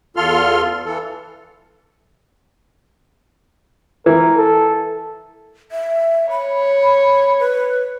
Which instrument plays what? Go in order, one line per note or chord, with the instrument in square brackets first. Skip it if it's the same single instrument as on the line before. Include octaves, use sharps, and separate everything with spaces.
[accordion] E2 F4 A4 C6 F6
E3 A4
[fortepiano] E3 [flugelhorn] A#4
[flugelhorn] A4
[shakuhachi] E5
[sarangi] C#5 [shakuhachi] B5
[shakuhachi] B4